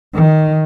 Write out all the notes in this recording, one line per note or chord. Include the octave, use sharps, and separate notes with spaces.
D#3